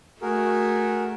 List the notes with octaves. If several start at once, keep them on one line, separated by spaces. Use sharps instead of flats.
A3 F#4 G#4 A#4